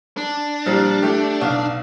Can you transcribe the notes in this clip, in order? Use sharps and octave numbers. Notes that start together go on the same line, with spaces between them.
D4
A#2 F3 G3
A3 G4
B1 F5